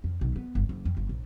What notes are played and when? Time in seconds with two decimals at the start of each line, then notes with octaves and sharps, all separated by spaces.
0.04 F2
0.21 B1
0.36 B3
0.55 G1
0.69 F#1
0.85 F2
0.97 G1
1.09 A#1